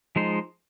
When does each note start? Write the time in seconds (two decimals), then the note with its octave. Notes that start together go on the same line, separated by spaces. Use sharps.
0.16 F3 G#3 D#4 C5